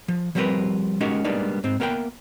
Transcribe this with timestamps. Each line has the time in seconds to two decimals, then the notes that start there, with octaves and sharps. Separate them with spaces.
0.08 F3
0.35 F3 G3 C4 G4 A#4 B4
1.01 G#3 C#4 D#4 F#4 G4 A#4
1.24 G3 G#3 A#3 B3 D4 D#4
1.64 G#2 C4
1.80 A#3 B3 A#4 E5 G5